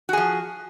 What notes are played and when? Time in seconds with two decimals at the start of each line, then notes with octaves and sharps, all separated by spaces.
0.09 F#4
0.13 G#4
0.17 F3